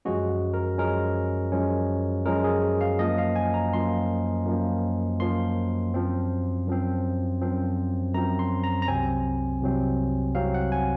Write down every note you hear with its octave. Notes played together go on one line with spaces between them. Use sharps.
F#2 F3 G#3 C#4 F#4
A#4
F#2 F3 G#3 C#4 A#4
F#2 F3 G#3 C#4
F#2 F3 G#3 C#4 A#4
G#4
F5
F#2 F3 A#3 D#5
F5
G#5
A#5
F#2 F3 A#3 C6
F#2 F3 A#3
F#2 F3 A#3 C6
F#2 F3 C4
F#2 F3 C4
F#2 F3 C4
F#2 F3 C4 A#5
C6
A#5
A#5
C2 C3 F#3 C4 G#5
C2 C3 F#3 C4
C2 C3 F#3 C4 F5
F#5
G#5